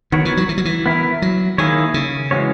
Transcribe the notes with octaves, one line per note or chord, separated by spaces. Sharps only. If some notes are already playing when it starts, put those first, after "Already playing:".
D#3 B3 F#4 A#4 C#5
E3
F#3
E3
F#3
E3
B3 E4 A#4
F#3
D#3 A#3 E4 G#4 C#5
C#3
E3 G#3 C#4 F#4 C#5